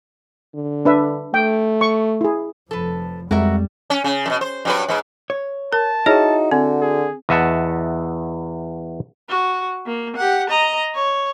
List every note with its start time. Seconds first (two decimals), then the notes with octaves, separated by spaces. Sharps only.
0.55 D3
0.85 D4 B4 E5
1.34 A3 G5
1.81 C#6
2.21 E4 G#4
2.71 F1 F3 A4 B4
3.31 F2 G3 G#3 F#4 A#4 E5
3.90 C#4
4.04 C#3
4.26 F#2 B2
4.41 C5
4.65 G2 F#3 B4
4.88 G#2 B3
5.30 C#5
5.73 A#4 A5
6.06 D#4 E4 F#4 G#4 C#5
6.51 D3 C4
6.81 G#4
7.29 E2 D#5 E5 F#5 A5
9.29 F#4
9.86 A#3
10.16 G4 F#5
10.50 D#5 A#5
10.95 C#5